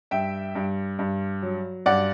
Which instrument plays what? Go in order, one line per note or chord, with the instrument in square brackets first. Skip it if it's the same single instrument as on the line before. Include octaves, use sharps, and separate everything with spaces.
[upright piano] G2 E5 G5
G2
G2
F#3
G2 D5 F#5